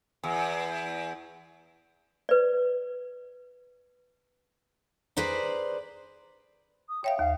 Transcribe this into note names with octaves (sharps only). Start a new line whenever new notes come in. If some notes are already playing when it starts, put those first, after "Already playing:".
E2
B4 D5
G#4 B4 C5 D5 A#5
D#6
C#5 E5 F5 G5
D#2 F5